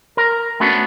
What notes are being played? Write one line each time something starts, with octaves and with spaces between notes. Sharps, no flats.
A#4
A3 B3 C#4 D4 F#4 A4